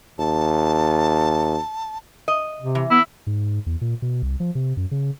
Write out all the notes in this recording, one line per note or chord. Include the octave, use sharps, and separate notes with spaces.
D#2 A5
D#5
C3
E3
B3 E4
G#2
E2
A#2
B2
C2
F3
C3
F#2
C#3